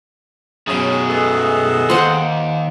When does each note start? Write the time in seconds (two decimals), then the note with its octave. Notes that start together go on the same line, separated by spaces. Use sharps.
0.67 F#2 B2 C#4 G#4
1.09 G#3 B3 A4
1.90 D#2 C5 F#5